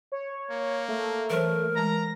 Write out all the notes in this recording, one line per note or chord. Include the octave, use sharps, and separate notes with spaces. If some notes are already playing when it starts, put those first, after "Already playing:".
C#5
A#3
A3
E3 F#3 A#4 C5
E3 G#3 A5 A#5 A#6